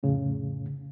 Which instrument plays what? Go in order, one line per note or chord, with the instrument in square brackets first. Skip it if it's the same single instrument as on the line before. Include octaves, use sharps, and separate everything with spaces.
[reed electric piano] F2 A2 C#3